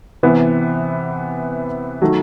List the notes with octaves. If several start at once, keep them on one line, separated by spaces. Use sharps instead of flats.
C3 E3 B3
D#3 F#3 A3